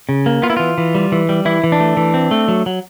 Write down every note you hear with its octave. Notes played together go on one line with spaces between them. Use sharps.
C#3
A#3
B3 F4
E4
E3 F4
E3
G3
E3
G3
E3 E4
E3
D4
A3
E3
C4
A3
F#3
F#3